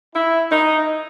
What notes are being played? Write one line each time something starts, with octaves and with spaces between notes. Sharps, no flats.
E4
D#4